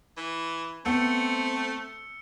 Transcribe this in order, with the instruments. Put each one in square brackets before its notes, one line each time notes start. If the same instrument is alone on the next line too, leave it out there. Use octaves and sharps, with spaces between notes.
[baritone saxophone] E3
[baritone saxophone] A3 [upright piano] B3 [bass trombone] C4 [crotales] E6 C#7